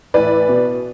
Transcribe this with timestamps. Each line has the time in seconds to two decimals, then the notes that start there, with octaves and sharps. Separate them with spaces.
0.14 A2 E3 B4 D5
0.49 B2